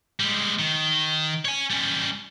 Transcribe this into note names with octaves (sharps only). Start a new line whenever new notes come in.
G3 G#3
D#3
C#5 G#5
G3 C#4